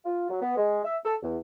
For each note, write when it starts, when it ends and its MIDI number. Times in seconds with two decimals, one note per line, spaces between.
0.05 0.28 65
0.30 0.42 54
0.42 0.55 59
0.57 0.80 56
0.84 0.97 76
1.05 1.16 69
1.23 1.37 40